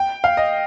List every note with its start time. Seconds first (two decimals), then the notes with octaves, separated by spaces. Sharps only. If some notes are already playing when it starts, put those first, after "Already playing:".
Already playing: G5
0.24 F5
0.37 D#5